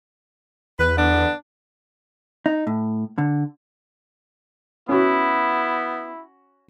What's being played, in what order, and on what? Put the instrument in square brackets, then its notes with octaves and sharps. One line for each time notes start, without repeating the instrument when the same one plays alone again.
[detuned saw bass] E2 [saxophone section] B4
[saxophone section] D3 B3 D4
[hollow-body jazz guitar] D#4
A2
D3
[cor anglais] B3 [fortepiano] C#4 F#4 [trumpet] E4